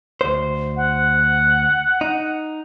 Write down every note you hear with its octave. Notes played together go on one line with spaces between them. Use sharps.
D2 C5
F#5
D#4